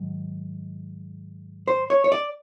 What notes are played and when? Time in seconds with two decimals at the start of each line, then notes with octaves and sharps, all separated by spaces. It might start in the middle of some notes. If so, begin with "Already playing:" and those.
Already playing: G#2 D#3 F#3
1.68 C5
1.90 C#5
2.04 C#5
2.12 D5